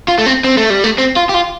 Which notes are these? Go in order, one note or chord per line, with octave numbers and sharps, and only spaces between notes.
F4
A3
C4
C4
A3
G3
A3
C4
F4
G4
F4